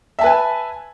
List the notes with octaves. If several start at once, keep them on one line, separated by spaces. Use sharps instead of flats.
B4 E5 G#5 A5